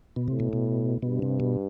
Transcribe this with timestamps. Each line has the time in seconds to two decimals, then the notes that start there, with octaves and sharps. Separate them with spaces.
0.16 B2
0.28 A2 C3
0.40 B2
0.53 B2
1.02 G2 B2
1.22 C3
1.40 B2